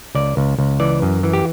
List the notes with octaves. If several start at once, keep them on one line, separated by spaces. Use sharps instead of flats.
C#2 D5
C#2
C#2
E3 D5
F#2
E3
G4